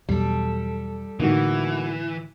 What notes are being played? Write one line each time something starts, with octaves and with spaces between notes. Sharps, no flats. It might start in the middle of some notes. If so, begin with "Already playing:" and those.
E2 B2 F#3 G3 A4
A2 D3 E3 A#3 D#4 F#4